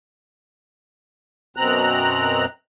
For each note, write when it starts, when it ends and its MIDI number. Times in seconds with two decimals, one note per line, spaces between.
1.57 2.46 42
1.57 2.46 47
1.57 2.46 60
1.57 2.46 82
1.57 2.46 90